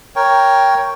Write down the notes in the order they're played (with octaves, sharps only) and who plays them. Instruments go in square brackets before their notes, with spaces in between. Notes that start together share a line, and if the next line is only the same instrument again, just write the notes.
[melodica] A#4 C#5 G5